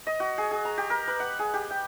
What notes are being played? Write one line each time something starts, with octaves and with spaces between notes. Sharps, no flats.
D#5
F#4
G#4
G#4
A#5
G4
A#4
B4
F#5
G#4
G4
G5